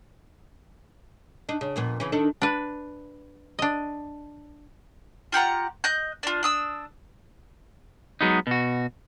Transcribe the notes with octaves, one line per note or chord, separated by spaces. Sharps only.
D4 D#4
C#3
F2 A#2 B3
C#3 E3 C#4
D#3 D4 A4
D4 B4
D4 D#5
F4 G4 F#5 A#5
D#5 F#6 G6
D4 F4
D4 D#6 E6
F#3 G#3 B3 D#4
B2 F#4